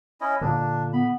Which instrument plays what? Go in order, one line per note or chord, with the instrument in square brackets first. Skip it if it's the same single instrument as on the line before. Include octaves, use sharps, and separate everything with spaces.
[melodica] C#4 E4 D#5
[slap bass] A#2 D3 [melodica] D4
[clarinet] B3 [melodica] B5